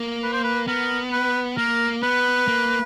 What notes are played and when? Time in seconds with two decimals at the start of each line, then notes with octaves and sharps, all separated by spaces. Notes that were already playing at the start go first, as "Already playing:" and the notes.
Already playing: A#3
0.23 B4
0.32 C5
0.44 B4
0.68 B3 A#4
1.12 B4
1.57 A#3 A#4
2.03 B3 B4
2.48 A#3